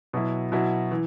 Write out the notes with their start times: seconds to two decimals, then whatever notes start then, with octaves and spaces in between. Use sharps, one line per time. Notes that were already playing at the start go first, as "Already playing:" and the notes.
0.13 B2 F#3 E4
0.52 B2 F#3 E4
0.91 E3